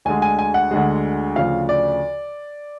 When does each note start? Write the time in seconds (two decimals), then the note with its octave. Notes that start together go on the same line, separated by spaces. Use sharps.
0.05 D2 D3 G#3 G#5
0.22 G#5
0.39 G#5
0.54 F#5
0.71 D2 D3 G#3
1.36 D2 C#3 F3 F5
1.69 D5